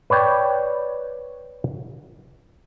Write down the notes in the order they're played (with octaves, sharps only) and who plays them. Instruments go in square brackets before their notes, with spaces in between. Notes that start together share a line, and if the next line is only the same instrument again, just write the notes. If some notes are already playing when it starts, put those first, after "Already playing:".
[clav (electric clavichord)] B4 C#5 D5 G5